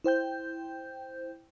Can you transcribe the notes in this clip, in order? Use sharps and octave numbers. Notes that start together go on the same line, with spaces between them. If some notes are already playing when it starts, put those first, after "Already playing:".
E4 C5 G5 G6